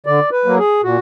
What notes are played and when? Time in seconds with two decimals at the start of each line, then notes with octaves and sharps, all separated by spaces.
0.06 D3 D5
0.32 B4
0.45 F#3 A#3
0.58 G#4
0.84 A#2 F#4